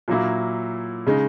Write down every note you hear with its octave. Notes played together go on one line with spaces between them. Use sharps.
A#2 F#3 A#3 E4
C#3 G#3 D#4